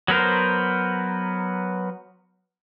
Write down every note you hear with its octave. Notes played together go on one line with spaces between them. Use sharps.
F#3 B3 A#4 C5